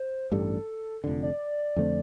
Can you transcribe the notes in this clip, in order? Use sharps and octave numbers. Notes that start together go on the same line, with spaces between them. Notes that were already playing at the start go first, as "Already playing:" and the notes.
Already playing: C5
A1 G2 G3 A4
F1 F2 D3
D5
F2 D3 A3 C4